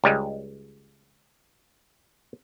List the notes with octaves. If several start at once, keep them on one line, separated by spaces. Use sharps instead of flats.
C#2 G3 G#3